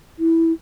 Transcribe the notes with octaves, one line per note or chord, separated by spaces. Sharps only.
E4